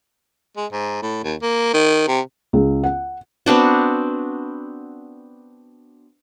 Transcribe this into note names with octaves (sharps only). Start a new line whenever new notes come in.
G#3
G#2
A2
D#2
A#3
D#3
C3
C#2
F#5
B3 C4 D4 F#4